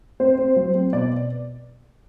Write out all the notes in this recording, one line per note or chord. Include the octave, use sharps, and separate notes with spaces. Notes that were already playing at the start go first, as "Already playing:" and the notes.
C4 C5
C4
F#3
C4
B2 D5